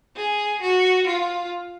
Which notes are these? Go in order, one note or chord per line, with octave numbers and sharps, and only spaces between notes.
G#4
F#4
F4